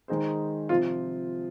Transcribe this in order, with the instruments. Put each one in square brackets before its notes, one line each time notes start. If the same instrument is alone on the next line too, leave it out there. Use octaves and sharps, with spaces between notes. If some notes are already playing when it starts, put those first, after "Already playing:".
[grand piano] D#3 G#3 D#4 G#4 C5
[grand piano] C3 F3 C4 [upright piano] F4